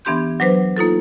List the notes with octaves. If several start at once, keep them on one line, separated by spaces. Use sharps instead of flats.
E3 B3 D4 G4 C6 G6
F#3 D4 B4 C5
A#3 D#4 F4 A4